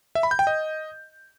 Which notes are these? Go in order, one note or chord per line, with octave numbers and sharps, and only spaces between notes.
E5
B5
G6
G5
D#5